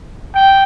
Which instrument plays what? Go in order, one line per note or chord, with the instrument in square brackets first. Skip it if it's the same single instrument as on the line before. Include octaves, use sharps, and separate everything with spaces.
[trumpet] G5